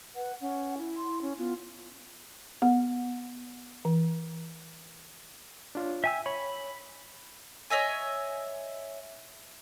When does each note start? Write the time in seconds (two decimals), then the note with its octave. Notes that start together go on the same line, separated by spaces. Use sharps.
0.15 B4 F#5
0.41 C#4 F#5
0.78 E4
0.97 C6
1.22 C#4
1.38 B3 F4
2.62 B3
3.85 E3
5.75 D4 F4 C#5
6.04 E5 G5 G#5 E6
6.26 C#5 B5
7.70 C#5 D#5 E5 G#5